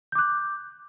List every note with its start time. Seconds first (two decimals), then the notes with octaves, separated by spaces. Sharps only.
0.12 G6
0.15 D6
0.18 F#6